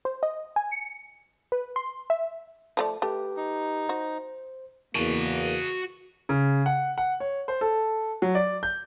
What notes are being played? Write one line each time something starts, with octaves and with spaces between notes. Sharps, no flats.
C5
D#5
G#5
C#7
B4
C6
E5
F3 A3 D5
A3 G4 B4
D#4
F#4 C5
E2 A#3 F#4 A5
C#3
F#5
F#5
C#5
C5
A4
F#3
D5
G6